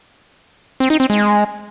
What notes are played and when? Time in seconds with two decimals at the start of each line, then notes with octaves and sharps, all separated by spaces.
0.80 C4
0.90 D#4
1.00 C4
1.10 G#3